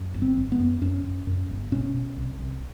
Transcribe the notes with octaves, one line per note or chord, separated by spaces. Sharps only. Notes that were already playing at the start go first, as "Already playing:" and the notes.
Already playing: F#2
G1
C4
G1
B3
F#2
F#2 C#4
F#2
F#2
G1
B2 C#4
B2
C2
C2